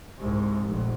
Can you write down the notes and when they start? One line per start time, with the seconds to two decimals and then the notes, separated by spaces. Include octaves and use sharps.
0.18 C2 G#2
0.64 F1 A#1